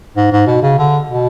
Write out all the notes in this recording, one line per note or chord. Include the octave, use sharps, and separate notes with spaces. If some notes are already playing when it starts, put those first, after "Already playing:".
G#2
G#2
B2
C#3
D3
B2